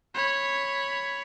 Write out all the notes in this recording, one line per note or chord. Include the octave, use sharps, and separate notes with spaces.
C#5 B5